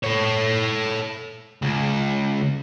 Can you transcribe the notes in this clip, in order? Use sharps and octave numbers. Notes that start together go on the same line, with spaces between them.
A4 C#5
C#2